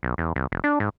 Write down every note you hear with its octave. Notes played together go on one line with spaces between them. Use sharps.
B1
E2
C2
F1
D4
G#2